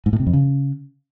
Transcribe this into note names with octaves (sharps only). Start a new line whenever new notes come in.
G#2
A2
C3
F2
C#3